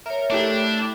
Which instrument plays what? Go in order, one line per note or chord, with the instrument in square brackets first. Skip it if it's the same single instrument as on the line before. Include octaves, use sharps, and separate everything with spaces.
[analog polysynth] A#4 [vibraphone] C#5 E5
[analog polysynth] A3 E4 G4 [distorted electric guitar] D4